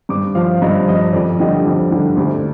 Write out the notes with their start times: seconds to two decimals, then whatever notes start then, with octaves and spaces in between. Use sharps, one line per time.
0.09 G2 D6
0.35 F3 F5
0.62 G2 D#5
0.88 F3 D#5
1.13 F2 D5
1.39 D3 G3 D#5
1.65 F2
1.91 D3 G3
2.17 D2